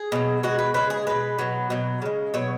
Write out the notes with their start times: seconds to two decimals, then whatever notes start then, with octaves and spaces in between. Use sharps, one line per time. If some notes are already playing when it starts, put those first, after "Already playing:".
Already playing: G#4
0.12 B2 F#3
0.43 B2 G#3 F#4
0.59 B4
0.74 C#3 G#3 B4
0.90 G#4
1.07 B2 G#3 B4
1.39 B2 F#3
1.70 B2 F#3
2.02 C#3 G#3
2.34 B2 F#3 C#5